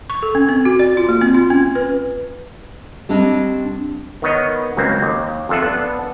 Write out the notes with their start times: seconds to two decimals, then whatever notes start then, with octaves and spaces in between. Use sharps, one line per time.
0.10 C#6
0.23 A4
0.35 C#4
0.49 C4
0.65 F#4
0.79 D5
0.97 F4
1.09 A#3
1.21 C4
1.34 F4
1.50 C#4
1.75 B4
3.09 G3 C4 D4 C#5 D#5
4.22 D#3 B3 C#5 D#5
4.77 C#2 F#3 A#3 C4
5.02 D#2
5.49 F2 F4 A4 E5 F#5
5.62 B3 D4